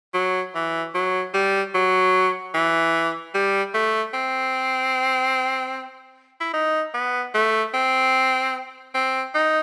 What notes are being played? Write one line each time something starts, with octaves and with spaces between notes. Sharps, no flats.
F#3
E3
F#3
G3
F#3
E3
G3
A3
C4
E4
D#4
B3
A3
C4
C4
D#4